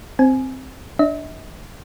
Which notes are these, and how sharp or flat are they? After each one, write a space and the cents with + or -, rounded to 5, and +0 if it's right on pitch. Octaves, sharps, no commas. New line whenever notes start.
C4 +0 G#5 +15
D4 +0 E5 -45